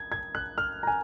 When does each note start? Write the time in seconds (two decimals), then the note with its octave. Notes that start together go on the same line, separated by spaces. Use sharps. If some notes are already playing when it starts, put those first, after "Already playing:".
Already playing: G#6
0.12 G#6
0.35 F#6
0.58 F6
0.83 A#5
0.87 G#5